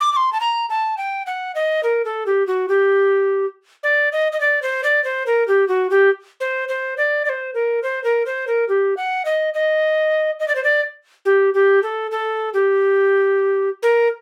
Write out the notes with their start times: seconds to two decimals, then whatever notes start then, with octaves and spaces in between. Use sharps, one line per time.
0.01 D6
0.12 D6
0.17 C6
0.32 A5
0.40 A#5
0.69 A5
0.97 G5
1.26 F#5
1.55 D#5
1.83 A#4
2.05 A4
2.26 G4
2.47 F#4
2.69 G4
3.83 D5
4.12 D#5
4.32 D#5
4.40 D5
4.62 C5
4.84 D5
5.04 C5
5.27 A#4
5.48 G4
5.68 F#4
5.90 G4
6.40 C5
6.69 C5
6.97 D5
7.25 D5
7.29 C5
7.54 A#4
7.83 C5
8.04 A#4
8.26 C5
8.47 A#4
8.69 G4
8.97 F#5
9.25 D#5
9.54 D#5
10.40 D#5
10.48 D5
10.55 C5
10.64 D5
11.25 G4
11.54 G4
11.83 A4
12.11 A4
12.54 G4
13.83 A#4